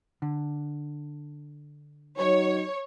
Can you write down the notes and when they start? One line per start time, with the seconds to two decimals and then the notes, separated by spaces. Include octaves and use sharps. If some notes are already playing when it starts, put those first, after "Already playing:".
0.22 D3
2.17 F#3 D#4 C#5